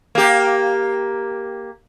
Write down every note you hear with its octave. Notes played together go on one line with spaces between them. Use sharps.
A#3 G4